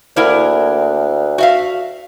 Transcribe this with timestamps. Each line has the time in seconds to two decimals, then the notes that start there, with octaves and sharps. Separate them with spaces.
0.16 D2 A#3 E4 A#4
1.38 F#4 E5 F5